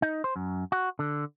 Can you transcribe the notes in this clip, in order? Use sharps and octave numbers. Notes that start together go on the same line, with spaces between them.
D#4
C5
F#2
F#4
D3